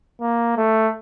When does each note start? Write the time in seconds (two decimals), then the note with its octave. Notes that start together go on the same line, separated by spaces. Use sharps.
0.21 A#3
0.57 A3